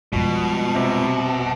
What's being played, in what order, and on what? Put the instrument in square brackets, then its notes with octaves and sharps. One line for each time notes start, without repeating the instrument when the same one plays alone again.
[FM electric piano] G#1 F2 [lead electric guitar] B2 [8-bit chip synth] G3 G#3 F4
[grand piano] C3